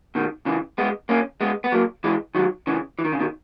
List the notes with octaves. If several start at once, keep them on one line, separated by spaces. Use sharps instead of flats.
B2 D#3
C#3 E3
G#3 B3
A#3 C#4
G#3 B3
B3
F#3 A#3
E3 G#3
D#3 F#3
C#3 E3
E3
D#3
C#3
B2 D#3